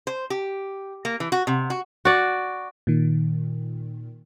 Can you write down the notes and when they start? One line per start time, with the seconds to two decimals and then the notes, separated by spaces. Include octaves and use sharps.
0.07 C5
0.30 G4
1.05 A#3
1.20 E3
1.32 F#4
1.47 C3
1.70 F#4
2.05 F#4 D5
2.87 A#2 D#3